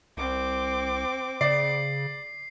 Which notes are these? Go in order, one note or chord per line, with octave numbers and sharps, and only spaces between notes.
C2 C4 D6
C#3 D5 C7